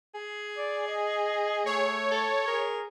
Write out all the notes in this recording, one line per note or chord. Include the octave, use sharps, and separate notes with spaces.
G#4
D5
D#5
A3 C#5
A4
G#4 A#4